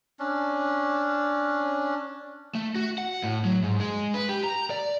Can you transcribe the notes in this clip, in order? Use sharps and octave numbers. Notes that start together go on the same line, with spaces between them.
C#4 D4
A3
F#4
F#5
A2
F#3
G#2
G#3
B4
G4
A#5
D5